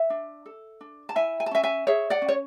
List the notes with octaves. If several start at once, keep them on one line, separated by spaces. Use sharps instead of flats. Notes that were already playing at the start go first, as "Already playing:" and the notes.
Already playing: E5
D4
A4
D4
A5
E4 E5 G#5
G#5
A5
C#4 E5 G#5
E5 G#5
G#4 C#5 E5
D5 F#5
C#4
C#5